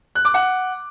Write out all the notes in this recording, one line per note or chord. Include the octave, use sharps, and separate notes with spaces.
F#6
D6
F#5